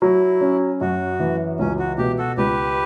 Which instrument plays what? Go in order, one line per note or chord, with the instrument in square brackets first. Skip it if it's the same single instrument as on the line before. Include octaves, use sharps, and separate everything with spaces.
[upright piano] F#3 [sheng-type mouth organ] E4
[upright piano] C#4
[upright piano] F#2 [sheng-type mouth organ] F#4
[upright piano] E3
[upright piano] C#2 [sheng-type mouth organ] C#4
[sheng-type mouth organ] F#4
[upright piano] B2 [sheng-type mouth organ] G4
[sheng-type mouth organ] F#4 A4
[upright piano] C#2 [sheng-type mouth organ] G4 B4